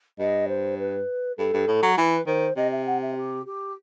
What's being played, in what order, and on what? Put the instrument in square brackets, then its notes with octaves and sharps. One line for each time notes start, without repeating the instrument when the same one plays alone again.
[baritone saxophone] G2 [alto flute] D#5
[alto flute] C5
B4
[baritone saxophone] G2 [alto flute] A4
[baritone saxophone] G2
A2
F#3
[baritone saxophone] E3 [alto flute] B4
[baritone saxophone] D#3 [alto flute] C5
[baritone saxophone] C3 [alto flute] D#5
[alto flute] E5
F#5
E5
G4
G4